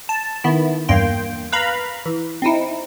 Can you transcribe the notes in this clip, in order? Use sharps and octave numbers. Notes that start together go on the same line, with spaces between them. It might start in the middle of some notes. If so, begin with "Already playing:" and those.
A5
D#3 B3 E4
E2 G2 A#3 G5 C6
B4 F5 A#5 B5
E3
C4 D#4 E4